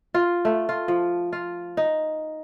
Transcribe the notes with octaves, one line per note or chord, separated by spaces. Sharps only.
F4
A3
F4
F3
F4
D#4